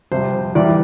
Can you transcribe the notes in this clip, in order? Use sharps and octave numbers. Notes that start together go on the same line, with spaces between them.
F2 C3 G3 C5
E2 E3 G3 D5